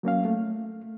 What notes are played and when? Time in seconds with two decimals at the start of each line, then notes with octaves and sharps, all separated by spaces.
0.03 F#3 A#3 C#4 F5
0.25 A3